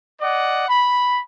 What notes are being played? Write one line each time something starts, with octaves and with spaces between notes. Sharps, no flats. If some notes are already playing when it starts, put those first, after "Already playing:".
D5 D#5 F#5
B5